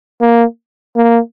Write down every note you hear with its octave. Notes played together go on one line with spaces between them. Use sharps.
A#3
A#3